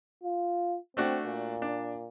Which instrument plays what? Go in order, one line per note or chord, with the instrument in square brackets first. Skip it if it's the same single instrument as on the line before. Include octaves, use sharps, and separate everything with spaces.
[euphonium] F4
[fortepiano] A3 D4 F#4 [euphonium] C4
[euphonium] A#2
[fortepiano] D4